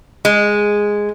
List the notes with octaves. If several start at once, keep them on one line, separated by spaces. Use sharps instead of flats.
G#3